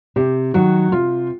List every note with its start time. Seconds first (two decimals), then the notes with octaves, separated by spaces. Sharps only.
0.16 C3 G4
0.54 D#3 F#3 F#4
0.92 C3 F4